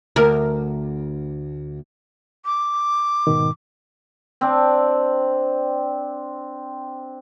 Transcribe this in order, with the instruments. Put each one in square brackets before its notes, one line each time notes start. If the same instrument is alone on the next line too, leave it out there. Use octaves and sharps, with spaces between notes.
[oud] D2 A#4
[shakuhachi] D6
[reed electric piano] G#2 B2 D#3
[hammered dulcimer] C4 D4